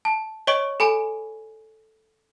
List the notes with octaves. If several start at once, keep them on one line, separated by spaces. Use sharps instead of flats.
A5
C#5 D#5 C#6 D7
A4 G#5 B5 D7